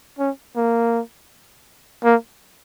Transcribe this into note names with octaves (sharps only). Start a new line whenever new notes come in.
C#4
A#3
A#3